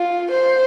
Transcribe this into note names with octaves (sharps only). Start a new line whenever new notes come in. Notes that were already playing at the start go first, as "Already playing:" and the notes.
Already playing: F4
C5